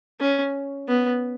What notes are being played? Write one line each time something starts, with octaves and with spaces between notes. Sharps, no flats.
C#4
B3